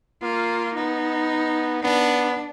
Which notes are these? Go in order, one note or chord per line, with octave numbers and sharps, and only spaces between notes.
A#3 F4
B3 D#4
B3 D4